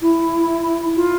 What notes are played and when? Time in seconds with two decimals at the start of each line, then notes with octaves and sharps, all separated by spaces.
0.02 E4
0.96 F4